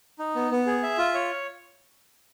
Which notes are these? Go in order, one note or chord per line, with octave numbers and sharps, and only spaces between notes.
D#4
B3
B3
G#4
E5
F4
C#5